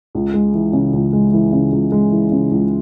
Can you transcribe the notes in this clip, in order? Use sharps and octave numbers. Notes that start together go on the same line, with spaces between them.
C#2
G#3
E3
C#3
C#2
G#3
E3
C#3
C#2
G#3
E3
C#3
C#2